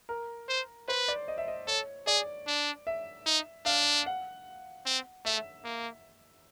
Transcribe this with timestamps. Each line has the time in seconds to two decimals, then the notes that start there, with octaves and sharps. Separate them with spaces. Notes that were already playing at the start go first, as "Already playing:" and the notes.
0.09 A#4
0.49 C5
0.88 B4 C5
1.08 D5
1.28 D#5
1.38 E5
1.48 D#5
1.67 A4 C#5
2.07 G#4 D5
2.47 D4
2.87 E5
3.26 D#4
3.66 D4 F5
4.06 F#5
4.86 C4
5.25 A3 E5
5.64 A#3